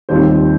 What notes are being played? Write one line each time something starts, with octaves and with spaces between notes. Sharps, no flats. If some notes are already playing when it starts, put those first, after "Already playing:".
D#2 D#3 G3 C4 F4 C5